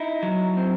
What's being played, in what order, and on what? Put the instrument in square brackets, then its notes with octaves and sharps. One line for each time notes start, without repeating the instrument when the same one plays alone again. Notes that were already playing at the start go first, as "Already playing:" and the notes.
Already playing: [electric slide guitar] D#4 E4
F#3
C4